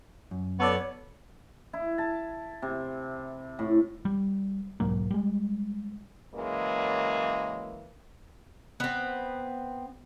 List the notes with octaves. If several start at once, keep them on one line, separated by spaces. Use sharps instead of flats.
F#2
B3 F#4 A4 C#5 D5
E4
A5
C3
A2
G3
B1 G#2 F#3 A#3
G3 G#3
C#3 E3 F#3 G#3 A#3
B3 C4